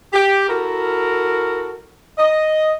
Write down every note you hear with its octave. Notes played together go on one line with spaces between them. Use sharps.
G4
E4 F#4 A4 A#4
D#5